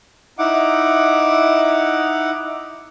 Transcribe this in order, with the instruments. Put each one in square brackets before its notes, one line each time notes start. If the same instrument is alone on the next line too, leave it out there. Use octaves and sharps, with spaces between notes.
[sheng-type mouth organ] D#4 E4 F#5 D6